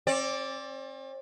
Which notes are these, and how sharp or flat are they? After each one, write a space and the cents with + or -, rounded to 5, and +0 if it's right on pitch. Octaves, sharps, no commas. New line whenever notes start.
C4 +40 D5 -5